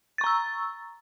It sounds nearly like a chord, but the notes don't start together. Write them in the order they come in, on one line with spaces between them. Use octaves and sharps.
A6 C#6 A#5 E6